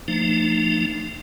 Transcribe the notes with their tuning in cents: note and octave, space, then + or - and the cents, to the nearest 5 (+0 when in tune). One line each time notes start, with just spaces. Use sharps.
F3 -15 A3 +35 D#4 -25